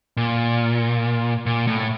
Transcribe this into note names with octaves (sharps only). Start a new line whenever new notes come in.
A#2
A#2
A2